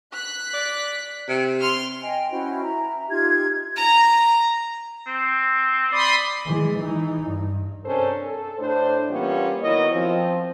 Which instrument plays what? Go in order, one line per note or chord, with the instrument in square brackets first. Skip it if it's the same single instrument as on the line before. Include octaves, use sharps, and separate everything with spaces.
[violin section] F#6 B6
[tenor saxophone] D5
C3
[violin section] C6 F6
[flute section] D#5 G5 G#5
C#4 E4 F#4 C5
E5 A#5
D#4 F4 G4 G#6
[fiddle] A#5
[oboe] C4
[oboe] D5 [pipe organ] B5 C6 D#6
[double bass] E3 G#3
E3 D#4
G2
[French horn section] C3 C#4 D4 A4 A#4 C5
A4
A2 D4 C5
E3 G3 A#3 B3 C#4 F4
D#3 F#3 B3 E4 C#5 D#5
F3 C4